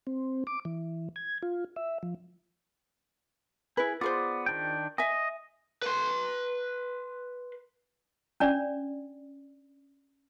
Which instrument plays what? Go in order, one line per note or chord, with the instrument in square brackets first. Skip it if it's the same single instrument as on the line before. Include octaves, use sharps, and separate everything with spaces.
[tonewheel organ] C4
D6
E3
G#6
F4
E5
F3
[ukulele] E4 B4 [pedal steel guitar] G#4
[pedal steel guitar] B3 D5 [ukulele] F4 G#4 C5
[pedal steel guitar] D#3 D4 G5
[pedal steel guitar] D#5 [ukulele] E5 G#5
[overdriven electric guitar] B4 C6
[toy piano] C#4 D4 D5